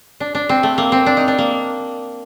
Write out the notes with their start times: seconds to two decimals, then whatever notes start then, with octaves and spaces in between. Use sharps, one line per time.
0.20 D4
0.35 D4
0.49 C4
0.63 A3
0.78 A#3
0.92 C4
1.06 D4
1.17 D#4
1.28 D4
1.38 A#3